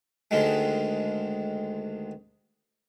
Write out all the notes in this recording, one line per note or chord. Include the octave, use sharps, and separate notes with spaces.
D2 D3 D#3 G#3